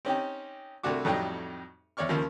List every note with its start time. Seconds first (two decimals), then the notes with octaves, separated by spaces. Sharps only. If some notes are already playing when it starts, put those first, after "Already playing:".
0.05 C4 C#4 D#4 G4
0.83 C2 C3 A3 D4 F#4 D6
1.05 F2 A2 F#3 G3 D#4 G4
1.97 E2 C#5 D5 C#6 F6
2.09 D#2 C#3 F3 A#3